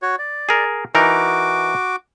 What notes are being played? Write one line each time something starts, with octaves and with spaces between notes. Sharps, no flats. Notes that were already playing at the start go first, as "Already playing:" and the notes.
F#4 C#5
D5
G#4 A#4
E3 D#4 F#4 A#4 D6